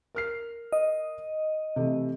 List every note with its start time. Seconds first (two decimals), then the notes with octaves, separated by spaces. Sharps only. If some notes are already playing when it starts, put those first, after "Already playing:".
0.15 A#4 F6 C7
0.73 D#5
1.76 C3 E3 A3